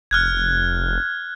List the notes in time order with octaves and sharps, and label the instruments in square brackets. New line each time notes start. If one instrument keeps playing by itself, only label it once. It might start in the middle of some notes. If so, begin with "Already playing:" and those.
[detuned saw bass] F1 [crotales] F6 F#6 G#6